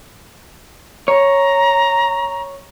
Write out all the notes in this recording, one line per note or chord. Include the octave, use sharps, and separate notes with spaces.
C#5 A#5